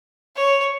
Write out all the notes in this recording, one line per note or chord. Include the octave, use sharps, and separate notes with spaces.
C#5